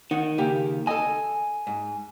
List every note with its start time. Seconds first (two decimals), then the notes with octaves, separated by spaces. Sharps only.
0.11 D#3 D#4 F#5
0.38 C#3 A#3 G4
0.87 A4 D#5 G#5
1.67 G#2